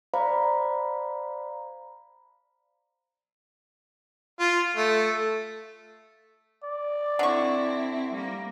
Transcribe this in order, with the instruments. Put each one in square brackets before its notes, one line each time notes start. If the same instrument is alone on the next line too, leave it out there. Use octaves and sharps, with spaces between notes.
[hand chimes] C5 D5 F5 A#5 B5
[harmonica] F4
A3
[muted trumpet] D5
[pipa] D3 C#6 [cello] C4 E4
[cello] G3 A#3